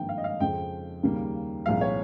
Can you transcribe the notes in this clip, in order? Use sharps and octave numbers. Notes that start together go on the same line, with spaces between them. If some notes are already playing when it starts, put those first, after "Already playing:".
Already playing: G#1 G2 F3 A#3 G5
F5
D#5
F5
F2 C#3 F3 G#3 C4 G5
D#2 C#3 G3 A#3
C2 A#2 F3 G#3 F5
C#5